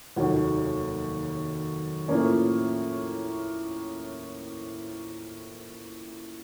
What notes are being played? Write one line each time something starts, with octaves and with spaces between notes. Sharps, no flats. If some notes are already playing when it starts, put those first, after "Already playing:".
F1 D#2 D#3 F#3
A2 F3 A#3 C#4